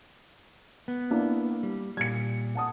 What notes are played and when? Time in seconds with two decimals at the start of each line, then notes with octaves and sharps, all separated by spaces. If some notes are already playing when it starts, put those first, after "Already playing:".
0.88 B3
1.11 A#3 D4 E4
1.63 G3
1.97 A#2 G3 G#6 C#7
2.55 F#5 A5 D#6